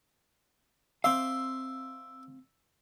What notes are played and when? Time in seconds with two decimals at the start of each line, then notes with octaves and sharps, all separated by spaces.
1.04 C4 E5 F5 C6 D6